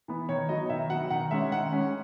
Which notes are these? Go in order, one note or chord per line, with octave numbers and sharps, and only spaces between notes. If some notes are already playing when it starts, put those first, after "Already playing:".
E3 B3 E4
D#3 C#5
F#3 B3 D#5
D#3 E5
F#3 B3 F#5
D#3 F#5
G#3 C#4 E5
D#3 F#5
G#3 C#4